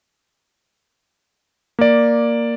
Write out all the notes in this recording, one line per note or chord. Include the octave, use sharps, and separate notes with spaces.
A#3 D5